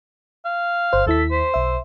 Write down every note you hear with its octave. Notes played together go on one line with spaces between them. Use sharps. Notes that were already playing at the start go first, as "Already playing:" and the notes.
F5
G1 C5
D#2 E4 A4 B6
C5
B1 E5